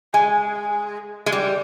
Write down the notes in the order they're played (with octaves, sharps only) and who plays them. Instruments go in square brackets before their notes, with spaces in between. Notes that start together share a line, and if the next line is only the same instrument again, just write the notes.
[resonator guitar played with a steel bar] G#3 [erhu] G#5
[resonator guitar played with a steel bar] G#3
G3